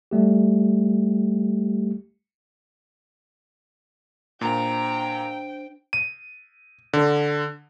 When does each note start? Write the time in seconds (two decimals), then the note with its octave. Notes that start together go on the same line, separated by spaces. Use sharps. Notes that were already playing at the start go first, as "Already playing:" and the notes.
0.11 G3 A3 G4
4.41 A#2 D4 C5 G5 A#5
5.93 D#7
6.93 D3